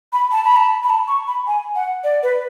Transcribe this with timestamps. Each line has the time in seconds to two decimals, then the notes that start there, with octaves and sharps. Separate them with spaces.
0.13 B5
0.32 A5
0.45 B5
0.56 A5
0.83 B5
0.90 A5
1.08 C#6
1.27 B5
1.47 G#5
1.75 F#5
2.04 D5
2.23 B4